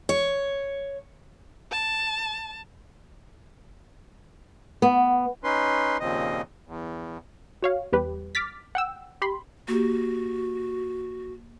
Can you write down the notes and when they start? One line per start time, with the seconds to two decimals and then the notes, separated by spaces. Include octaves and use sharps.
0.09 C#5
1.72 A5
4.82 B3
5.44 C#4 D#4 B4 C6
6.00 D#2 A#2 C#3 F3 C4 D#5
6.67 E2
7.63 F#4 C#5 F5
7.93 E2 G3 G4 B4
8.35 D6 F6 A6 B6
8.75 F#5 G5 E6
9.22 G4 B5 C6
9.68 A#3 F#4 G4